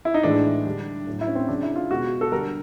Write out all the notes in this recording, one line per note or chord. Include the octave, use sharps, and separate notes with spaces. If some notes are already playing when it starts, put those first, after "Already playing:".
E4
D#4
A2 E3 G#3 D4
D3 G3
A2 F#3
E4
C#4
C4
C#3 F#3 D4
E4
F4
B2 G#3 F#4
A4
D3 G3 A#4